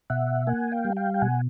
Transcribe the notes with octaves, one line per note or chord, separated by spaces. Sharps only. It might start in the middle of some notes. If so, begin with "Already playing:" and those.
B2 E5 F#5
A#3 F#5 G#5
F5 G5
G3
F5 G5
G5
B2 F#5 G#5